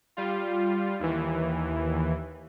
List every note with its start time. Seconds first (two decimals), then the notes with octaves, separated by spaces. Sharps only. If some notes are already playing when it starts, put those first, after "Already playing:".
0.17 G3 F4
1.00 D#2 E3